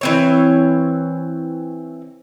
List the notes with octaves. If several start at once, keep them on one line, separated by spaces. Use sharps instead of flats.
E3 C4 C#5